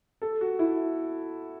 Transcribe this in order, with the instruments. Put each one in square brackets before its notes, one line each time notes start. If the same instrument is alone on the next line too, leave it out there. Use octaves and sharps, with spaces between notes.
[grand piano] A4
F#4
E4